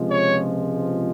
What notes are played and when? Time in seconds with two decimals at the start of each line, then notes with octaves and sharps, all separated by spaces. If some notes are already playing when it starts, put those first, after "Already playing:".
Already playing: C#2 C3 F3 G#3
0.09 C#5